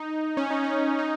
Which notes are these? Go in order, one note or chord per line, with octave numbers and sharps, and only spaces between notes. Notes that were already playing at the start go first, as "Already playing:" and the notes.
Already playing: D#4
C#4
D#4
C#4
D#4